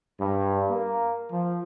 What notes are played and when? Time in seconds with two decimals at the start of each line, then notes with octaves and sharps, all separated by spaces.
0.21 G2
0.71 A#3
1.31 F3